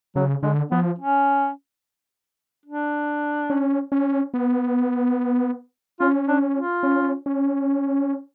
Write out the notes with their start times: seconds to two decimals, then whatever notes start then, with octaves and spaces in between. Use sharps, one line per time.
0.16 C#3 F#3
0.43 D3 G#3
0.71 F3 B3
0.99 C#4
2.66 D4
3.50 C#4
3.92 C#4
4.34 B3
6.00 C#4 F4
6.28 D4
6.56 F4
6.83 C#4
7.26 C#4